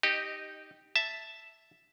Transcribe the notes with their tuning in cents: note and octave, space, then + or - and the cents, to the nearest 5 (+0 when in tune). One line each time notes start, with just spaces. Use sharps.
D#4 +0 G4 +0 D#5 -20
E5 +0 A5 +0